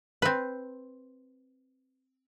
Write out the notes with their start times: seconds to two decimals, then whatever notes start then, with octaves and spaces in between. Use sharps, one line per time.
0.22 C4 B4